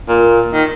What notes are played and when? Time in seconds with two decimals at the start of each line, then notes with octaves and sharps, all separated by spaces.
0.08 A#2
0.53 D#3